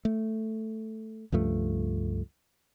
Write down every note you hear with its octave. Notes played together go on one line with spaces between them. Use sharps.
A3
C#2 G2 F3 A3